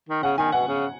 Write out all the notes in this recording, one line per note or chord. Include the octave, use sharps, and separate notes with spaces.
D#3
C#3 F#5
D#3 G#5
B2 F#5
C#3